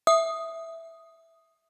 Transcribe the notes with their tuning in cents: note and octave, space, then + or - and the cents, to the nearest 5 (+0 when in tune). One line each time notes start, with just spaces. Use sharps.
E5 +0 D#6 +0